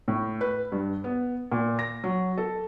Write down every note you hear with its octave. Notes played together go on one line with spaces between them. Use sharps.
A2
B4
G2
B3
A#2
A#6
F#3
A4